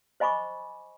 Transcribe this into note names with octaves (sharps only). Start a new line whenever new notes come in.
C5 D#5 G#5 B5 C#6 D6